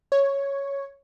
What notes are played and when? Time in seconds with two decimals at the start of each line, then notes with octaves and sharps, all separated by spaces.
0.12 C#5